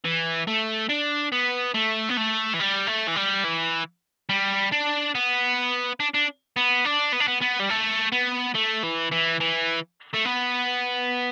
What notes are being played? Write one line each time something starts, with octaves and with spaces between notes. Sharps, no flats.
E3
A3
D4
B3
A3
B3
A3
E3
G3
A3
E3
G3
E3
G3
D4
B3
D4
D4
B3
D4
B3
D4
B3
B3
G3
A3
B3
A3
E3
E3
E3
A3
B3